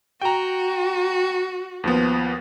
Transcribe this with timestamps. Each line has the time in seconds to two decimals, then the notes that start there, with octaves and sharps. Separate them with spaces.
0.22 F#4 G5 A#5
1.84 D#2 F3 B3